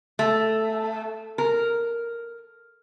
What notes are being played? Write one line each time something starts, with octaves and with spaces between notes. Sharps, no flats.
A3
A#4